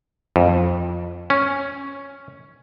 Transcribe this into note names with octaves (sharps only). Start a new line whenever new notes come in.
F2
C#4